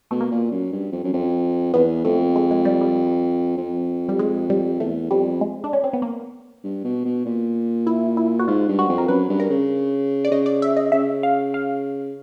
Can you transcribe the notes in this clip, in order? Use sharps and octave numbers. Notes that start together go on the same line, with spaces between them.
B2 A3
A#3
A#2
F#2
G2
F2
F#2
F2
E2 B3
F2 A3
G#3
G#3
G3
G3
F2
G3
G#3
G3
E2 A3
F2 G3
G#3
D4
C#4
C4
B3
A#3
G2
B2
B2
A#2
E4
E4
F#4
G#2 F4
G2
F#4
F2
A#4
F#2 B4
G2
A#4
C#3
D5
C#3 D#5
D5
E5
D#5
C#3 E5
F5
F5